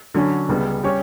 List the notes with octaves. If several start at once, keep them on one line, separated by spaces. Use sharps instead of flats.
D3 F#3 C#4
C#2 C#3 G3 B3
G3 C#4 G4 C#5